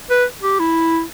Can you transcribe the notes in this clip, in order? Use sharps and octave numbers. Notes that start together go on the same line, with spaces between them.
B4
G4
E4